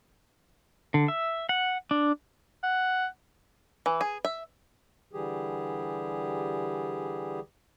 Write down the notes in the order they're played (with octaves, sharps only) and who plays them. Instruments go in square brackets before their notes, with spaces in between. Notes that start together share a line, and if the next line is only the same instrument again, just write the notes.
[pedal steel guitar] D3
E5
F#5
D4
[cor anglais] F#5
[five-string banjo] E3
G#4
E5
[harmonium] D3 E3 G3 G4 G#4